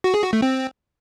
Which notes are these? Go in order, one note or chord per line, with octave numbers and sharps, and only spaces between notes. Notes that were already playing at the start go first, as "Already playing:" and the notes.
F#4
G#4
F#4
A3
C4